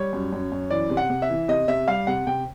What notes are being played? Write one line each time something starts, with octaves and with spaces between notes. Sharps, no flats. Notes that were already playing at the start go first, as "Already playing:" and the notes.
Already playing: G3 C#5
F#2
F#2
F#2
E3 D5
C3
F#5
C3
E5
E3
C3 D#5
C3 E5
G3 F5
C3 F#5
C3 G5